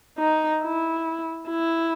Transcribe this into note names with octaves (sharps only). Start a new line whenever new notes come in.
D#4
E4
E4